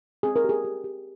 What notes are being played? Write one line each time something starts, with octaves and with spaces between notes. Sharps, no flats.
C4 G#4
A#4
G4 G#4
G4
G4